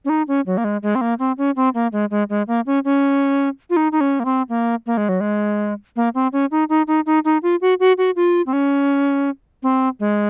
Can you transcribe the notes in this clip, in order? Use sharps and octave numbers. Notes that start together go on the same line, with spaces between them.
C#4
D#4
C#4
F#3
A#3
G#3
G#3
C4
A#3
C4
C#4
C4
A#3
G#3
G#3
G#3
A#3
C#4
C#4
F4
D#4
D#4
C#4
A#3
C4
A#3
A#3
G#3
F#3
G#3
A#3
C4
C#4
D#4
D#4
D#4
D#4
D#4
F4
F#4
F#4
F#4
F4
C4
C#4
C4
G#3